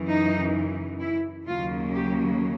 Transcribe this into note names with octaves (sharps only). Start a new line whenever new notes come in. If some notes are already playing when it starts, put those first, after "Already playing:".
Already playing: F#2 C#3 E3
D#4
E4
D#2 C#3 F#3 A#3 F4
G4